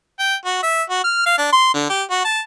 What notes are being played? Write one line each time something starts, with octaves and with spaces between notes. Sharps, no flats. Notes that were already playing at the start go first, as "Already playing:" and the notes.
G5
F#4
E5
F#4
F6
F5
D4
C6
D3
G4
F#4
A5